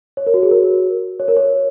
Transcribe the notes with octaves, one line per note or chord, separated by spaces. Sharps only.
C#5
A#4
F#4
G#4
A#4
C#5
A#4
C#5